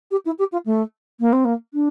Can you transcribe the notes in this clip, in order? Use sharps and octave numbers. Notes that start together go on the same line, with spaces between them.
G4
E4
G4
F4
A3
A#3
C4
A#3
D4